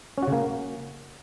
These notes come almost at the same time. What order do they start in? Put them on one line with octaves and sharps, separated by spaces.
C#4 F#4 C#3 A#3